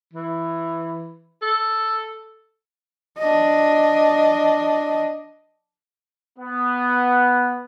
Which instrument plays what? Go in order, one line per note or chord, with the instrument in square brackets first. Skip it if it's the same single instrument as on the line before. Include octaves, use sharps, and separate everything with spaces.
[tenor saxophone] E3
A4
[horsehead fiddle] D4 D#5
[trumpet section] B3